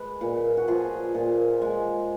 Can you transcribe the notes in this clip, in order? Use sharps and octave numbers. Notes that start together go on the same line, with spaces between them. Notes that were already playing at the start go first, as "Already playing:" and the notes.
Already playing: G#3 B4 D#5
A#2
F#4
F3 F4 G#4
A#2
G#3